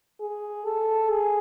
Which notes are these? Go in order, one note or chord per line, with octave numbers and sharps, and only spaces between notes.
G#4
A4
G#4